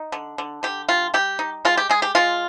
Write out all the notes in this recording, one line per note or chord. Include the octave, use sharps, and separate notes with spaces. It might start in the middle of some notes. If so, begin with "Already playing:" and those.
Already playing: D#4
D3
D3
D3 G4
G3 F4
G3 G4
D#4
G#3 F4
G4
G#3 G#4
G4
G#3 F4